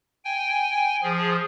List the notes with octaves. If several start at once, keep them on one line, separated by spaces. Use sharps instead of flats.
G5 G#5
F3 G#4